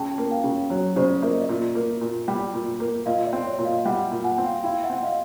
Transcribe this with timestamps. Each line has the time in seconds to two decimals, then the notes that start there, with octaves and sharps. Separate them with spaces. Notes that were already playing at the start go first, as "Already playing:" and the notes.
Already playing: C#3 G5 A5
0.18 A#3
0.31 F5 G5
0.44 C#3
0.70 F#3 C#5
0.96 C#3 C5 D5
1.22 A#3 E5
1.32 D#5
1.41 D5 E5
1.49 A#2
1.75 A#3
2.01 A#2
2.28 G3
2.54 A#2
2.80 A#3
3.06 A#2 D#5 F5
3.26 D5 E5
3.33 C4
3.46 C#5
3.59 A#2
3.65 D#5 F5
3.85 G3 E5 F#5
4.11 A#2
4.24 F#5 G#5
4.38 C4
4.45 F5 G5
4.64 E4 F5 G5
4.84 E5 F#5
4.90 C4
5.03 D#5 F5